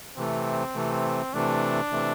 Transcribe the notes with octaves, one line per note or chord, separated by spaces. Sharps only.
C3 E3 A3 C4
C3 E3 A3
C3 E3 A3 D4
C3 E3 A3